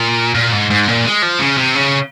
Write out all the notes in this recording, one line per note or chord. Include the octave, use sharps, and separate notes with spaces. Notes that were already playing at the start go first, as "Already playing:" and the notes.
Already playing: A#2
A#2
G#2
G#2
A#2
G#3
F3
C#3
C3
C#3